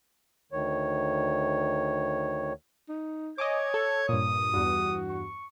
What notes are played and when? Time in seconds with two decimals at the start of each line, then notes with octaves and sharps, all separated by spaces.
0.52 D2 D#3 C#5
2.89 D#4
3.38 C#5 D#5 G#5 D6 G#6
3.74 A4
4.09 G2 A#2 D#6
4.53 E2 G2 F#4
5.10 C#6